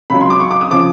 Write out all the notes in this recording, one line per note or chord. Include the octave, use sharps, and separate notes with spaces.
C#2 C#3 F#3 B5
C6
D6
C#6
D6
D#6
C#3 F3 D6